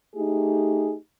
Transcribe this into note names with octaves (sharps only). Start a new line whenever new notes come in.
A3 D#4 G4 G#4